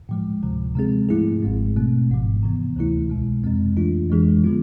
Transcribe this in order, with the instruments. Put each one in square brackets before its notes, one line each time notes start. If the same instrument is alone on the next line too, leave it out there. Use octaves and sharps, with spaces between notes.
[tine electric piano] A2 F3 G#3
D2 C3 F3
C3 G#3 C4 G#4
G#2 F3 A3 E4 G#4
G#1 G#2 G#3 C4
B2 A3 C4
G#1 G#2 F3
C3 E3 B3
D2 C3 E3 A3 E4
C2 B2 G#3
F2 C3 G#3 C4
F2 E3 A3 D4 F4
F2 E3 G#3 D4 G#4
D3 F3 B3 F4